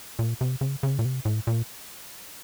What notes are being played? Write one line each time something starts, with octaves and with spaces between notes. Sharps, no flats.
A#2
C3
C#3
C#3
A#2
C3
A2
A#2